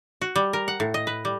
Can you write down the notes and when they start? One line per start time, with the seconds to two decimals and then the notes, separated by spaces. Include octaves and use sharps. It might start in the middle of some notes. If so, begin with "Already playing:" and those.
0.21 F#4
0.36 G3
0.53 A#4
0.68 F#5
0.80 A2
0.94 D#5
1.07 B4
1.25 G3